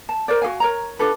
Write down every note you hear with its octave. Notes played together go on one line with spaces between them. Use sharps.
A5
A#4 C5 D5
F#4 G#4 F5 G#5
A#4 C#5 A#5
D4 F4 A4 B4